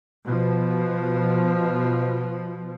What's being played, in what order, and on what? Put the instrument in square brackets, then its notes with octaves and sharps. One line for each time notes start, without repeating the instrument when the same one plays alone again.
[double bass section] B2 F3